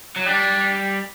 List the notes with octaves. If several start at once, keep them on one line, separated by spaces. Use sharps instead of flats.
F#3
G3 D4